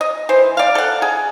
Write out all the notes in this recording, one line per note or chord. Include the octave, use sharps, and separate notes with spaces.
D#5
E3 C5
D5 F5
A4 F#5
G#4